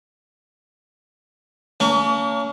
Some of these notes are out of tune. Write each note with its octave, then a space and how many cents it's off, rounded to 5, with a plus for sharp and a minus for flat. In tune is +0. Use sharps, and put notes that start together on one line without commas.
A#3 -40 C#4 +35